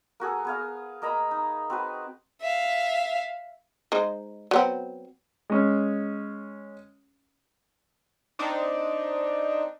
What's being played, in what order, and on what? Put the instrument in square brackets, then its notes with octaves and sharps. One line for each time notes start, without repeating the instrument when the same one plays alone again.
[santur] A#3 F#4 G#4 A4
B3 G#4 F5
A#3 D#5 A#5 B5
D#4
C4 F#4 B4
[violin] E5 F5
[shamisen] G#3 D#4 C5
F#3 B3 C4
[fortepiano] G#3 C#4
[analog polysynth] C4 D4 D#4